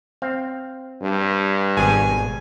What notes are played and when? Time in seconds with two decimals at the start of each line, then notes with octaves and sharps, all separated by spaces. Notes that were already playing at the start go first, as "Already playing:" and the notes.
0.22 C4 F5
1.02 G2
1.77 G#1 B2 G#4 G#5